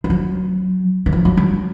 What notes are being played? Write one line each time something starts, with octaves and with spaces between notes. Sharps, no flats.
F3
F#3
E3
F3
F#3
F#3